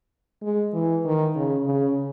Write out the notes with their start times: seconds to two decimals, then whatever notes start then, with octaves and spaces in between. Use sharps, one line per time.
0.42 G#3
0.74 E3
1.05 D#3
1.36 C#3
1.66 C#3